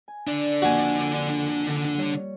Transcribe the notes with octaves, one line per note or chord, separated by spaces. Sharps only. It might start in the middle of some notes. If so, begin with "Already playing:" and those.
G#5
D3 D4 D5
F2 A#3 F#4 G#5
G3 C#5